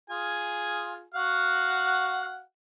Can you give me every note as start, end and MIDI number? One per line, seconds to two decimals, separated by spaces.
0.10 1.03 65
0.10 1.03 68
0.10 1.03 80
1.14 2.42 66
1.14 2.42 77
1.14 2.42 78